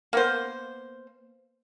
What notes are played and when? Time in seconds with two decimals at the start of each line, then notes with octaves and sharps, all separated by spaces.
0.13 A#3 B3 C5